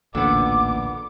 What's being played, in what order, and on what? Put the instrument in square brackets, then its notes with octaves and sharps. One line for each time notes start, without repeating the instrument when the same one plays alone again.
[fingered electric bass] A1 D2 A#2 [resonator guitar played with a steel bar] D3 B3 [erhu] D6